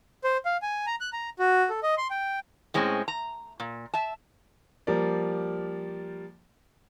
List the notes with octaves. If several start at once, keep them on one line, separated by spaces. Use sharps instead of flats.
C5
F5
G#5
A#5
F#6
A#5
F#4
A4
D#5
C6
G5
A2 G#3 C4 C#4
A#5
A#2
E5 A5
F3 G3 A#3 A#4 D5